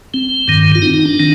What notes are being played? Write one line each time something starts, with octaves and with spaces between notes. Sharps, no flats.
C4
G2 D#3
F4
D#4
D#4
D4
D#3